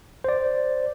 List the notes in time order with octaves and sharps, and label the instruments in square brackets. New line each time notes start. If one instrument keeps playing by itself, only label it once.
[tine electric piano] C5 D5